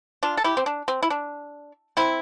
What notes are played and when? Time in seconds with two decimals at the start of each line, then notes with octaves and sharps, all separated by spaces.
0.23 D4 F4
0.37 A4
0.44 E4 G4
0.57 C4
0.66 D4
0.88 C4
1.02 E4
1.10 D4
1.97 C4 E4